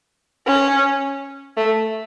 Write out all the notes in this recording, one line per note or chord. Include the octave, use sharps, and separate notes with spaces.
C#4
A3